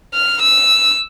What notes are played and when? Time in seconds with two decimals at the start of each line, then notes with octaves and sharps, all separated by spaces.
0.14 F6
0.42 E6